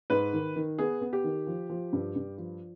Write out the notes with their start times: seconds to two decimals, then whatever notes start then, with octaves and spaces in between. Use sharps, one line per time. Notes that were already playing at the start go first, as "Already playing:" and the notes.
0.10 G#2 B4
0.33 D#3
0.56 D#3
0.78 B3 G#4
1.01 B3
1.13 G4
1.24 D#3
1.47 F3
1.70 F3
1.93 G2
2.16 G2
2.38 F3